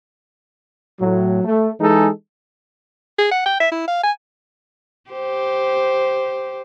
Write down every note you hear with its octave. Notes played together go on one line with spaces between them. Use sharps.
A2 F#3
A3
E3 G#3 D#4 G#4 A4
G#4
F#5
G5
E5
E4
F5
G#5
G4 C5